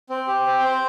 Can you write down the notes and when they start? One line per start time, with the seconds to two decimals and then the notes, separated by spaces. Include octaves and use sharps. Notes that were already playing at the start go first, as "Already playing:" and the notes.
0.10 C4
0.27 G4
0.45 C4
0.64 C5